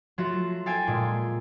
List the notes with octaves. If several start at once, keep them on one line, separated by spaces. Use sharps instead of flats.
F#3 A3 F4 F#4 E7
A4 F5 G5 G#5
A#2 G#3